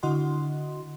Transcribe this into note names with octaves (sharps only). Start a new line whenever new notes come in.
D3 E4 F#4 D#5 F#5 C6